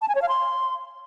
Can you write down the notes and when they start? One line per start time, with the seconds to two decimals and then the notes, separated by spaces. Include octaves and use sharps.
0.02 A5
0.08 G#5
0.15 C#5
0.22 F5
0.29 C6